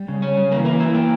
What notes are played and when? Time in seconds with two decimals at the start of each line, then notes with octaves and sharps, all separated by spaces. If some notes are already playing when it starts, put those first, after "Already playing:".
Already playing: G3
0.08 C#3
0.22 C#4
0.37 C#3
0.52 E3 A#3
0.65 A#3
0.80 E4
0.94 A#3